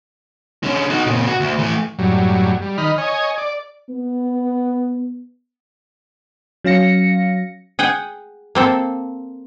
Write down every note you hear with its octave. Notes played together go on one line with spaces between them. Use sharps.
D3 C#4
D#4 F#4
A#2 C#3
F#4
D2
E3 A3
F#2 A2 F#3 G3
G3
D#3 D#5 B5 F6
C#5 D#5 G#5
D5
B3
F#3 C#4 F5 A#6 C#7
G#4 F#5 G5
A#3 C4 A4